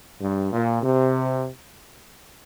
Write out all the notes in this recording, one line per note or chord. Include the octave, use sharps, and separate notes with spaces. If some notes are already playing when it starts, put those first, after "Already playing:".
G2
A#2
C3